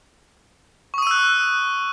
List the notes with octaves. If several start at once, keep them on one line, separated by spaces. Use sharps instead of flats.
C#6 D#6 E6 F#6 D#7